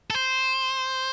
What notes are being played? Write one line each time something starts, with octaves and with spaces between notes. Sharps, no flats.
A4
C5